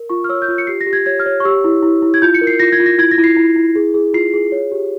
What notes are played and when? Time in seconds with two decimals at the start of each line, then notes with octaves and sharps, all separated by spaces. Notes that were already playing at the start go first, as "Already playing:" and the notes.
Already playing: A#4
0.09 F4 C#6
0.24 F6
0.29 C#5 E6
0.42 G6
0.48 F4
0.58 C#7
0.67 G4 C7
0.81 A#6
0.86 G4
0.93 G#6
1.06 C#5 G#6
1.20 F6
1.26 C#5
1.40 C#6
1.45 G4 E6
1.64 E4
1.83 E4
2.02 E4
2.14 G#6
2.22 F4 G6
2.34 C#7
2.41 A#4
2.47 C7
2.60 F4 A#6
2.72 G#6
2.80 F4
2.86 A#6
2.98 E4 G#6
3.11 A#6
3.18 E4
3.24 C7
3.37 E4
3.56 E4
3.75 G#4
3.94 G#4
4.14 F4 C7
4.34 G#4
4.52 C#5
4.72 G4